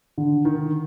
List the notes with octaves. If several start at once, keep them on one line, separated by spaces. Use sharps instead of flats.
D3
D#3